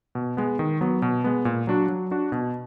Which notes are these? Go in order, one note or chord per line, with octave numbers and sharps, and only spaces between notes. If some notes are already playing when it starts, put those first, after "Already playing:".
B2
G#3 B3
D#3
F#3 B3
B2
G#3 B3
A#2
F#3 D4 F#4
F#3
D4 F#4
B2